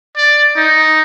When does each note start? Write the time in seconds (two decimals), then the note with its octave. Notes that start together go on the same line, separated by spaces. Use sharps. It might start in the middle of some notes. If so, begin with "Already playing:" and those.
0.17 D5
0.56 D#4